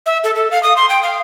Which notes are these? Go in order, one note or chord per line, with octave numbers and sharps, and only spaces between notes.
E5
A4
A4
F5
D#6
C6
G5
F5